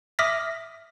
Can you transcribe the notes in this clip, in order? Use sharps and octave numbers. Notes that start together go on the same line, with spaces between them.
E5 D6 D#6 F6 A#6 B6